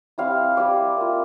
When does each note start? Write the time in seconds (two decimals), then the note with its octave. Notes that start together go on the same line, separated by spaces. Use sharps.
0.18 G3 C4 E4 F5
0.57 G3 C4 E4 D5
0.97 A#3 F4